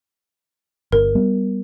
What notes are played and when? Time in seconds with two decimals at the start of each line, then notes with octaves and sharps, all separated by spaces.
0.92 G1 A#4
1.15 G3 B3